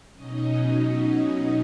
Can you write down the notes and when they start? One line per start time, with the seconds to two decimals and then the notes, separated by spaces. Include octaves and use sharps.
0.14 B2 F#3 C#4 D#4 D#5